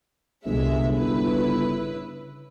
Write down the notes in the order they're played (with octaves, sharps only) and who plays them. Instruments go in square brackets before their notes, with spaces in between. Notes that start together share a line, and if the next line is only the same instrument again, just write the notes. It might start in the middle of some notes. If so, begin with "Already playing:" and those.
[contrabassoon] G1 [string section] C2 G#3 E5
[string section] C#3 E4 B4